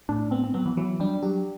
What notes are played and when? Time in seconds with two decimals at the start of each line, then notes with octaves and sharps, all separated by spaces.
0.09 A2 D4
0.31 B3 C4
0.44 C4
0.54 F#3 B3
0.66 E3
0.77 E3 F#3
1.00 G3 D4
1.22 F#3 G4